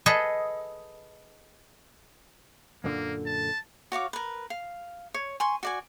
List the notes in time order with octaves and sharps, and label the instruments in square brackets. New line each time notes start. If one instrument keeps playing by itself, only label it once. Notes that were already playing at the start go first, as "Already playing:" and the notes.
[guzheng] G#4 A4 B4 D#5
[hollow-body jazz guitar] F#2 A#2 D3 [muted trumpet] A#3
[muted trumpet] A5
[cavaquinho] F#4 C#5 F5 D6
A#4 B4
F5
C#5
G#5 C6 C#6
F#4 D5 G#5